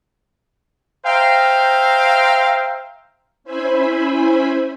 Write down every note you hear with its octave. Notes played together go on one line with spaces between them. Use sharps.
C5 E5 F5 G5 A#5
C#4 E4 C5 E5 G#5 B5